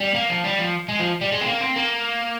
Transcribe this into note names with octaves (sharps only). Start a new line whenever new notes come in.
G3
A#3
F3
G3
F3
G#3
F3
G3
G#3
C4
A#3
C4
A#3